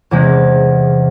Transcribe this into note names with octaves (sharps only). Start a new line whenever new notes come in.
E2 C3 E3 G#3 E4